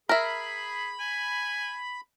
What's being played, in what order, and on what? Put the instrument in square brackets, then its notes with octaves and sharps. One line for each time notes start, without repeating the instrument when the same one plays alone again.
[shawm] G#4 [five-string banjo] A#4 E5 [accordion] B5
[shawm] G#5